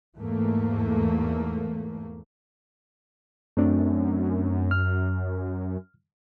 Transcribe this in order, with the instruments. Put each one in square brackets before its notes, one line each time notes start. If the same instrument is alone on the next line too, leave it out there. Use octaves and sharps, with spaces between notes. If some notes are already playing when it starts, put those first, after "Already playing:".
[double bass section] E2 G#2 A3 A#3
[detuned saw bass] F#2 [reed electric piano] A3 C4 D4
[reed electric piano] F6